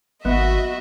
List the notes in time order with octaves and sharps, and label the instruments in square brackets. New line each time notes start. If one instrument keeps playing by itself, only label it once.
[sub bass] G#1 [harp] B3 [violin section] F#4 D#5 E5